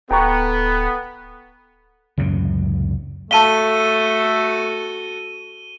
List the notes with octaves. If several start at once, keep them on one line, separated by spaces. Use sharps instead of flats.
D1 B3 A4 G5 A#5 C#6
C#2 F#2 A2 C3
A3 F#4 A4 F5 A5 D#7 G7